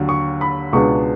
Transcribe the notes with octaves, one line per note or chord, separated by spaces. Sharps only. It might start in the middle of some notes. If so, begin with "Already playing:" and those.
Already playing: D#2 D3 F#3
C#6
B5
C#2 B2 G#3 B3 D4 C#6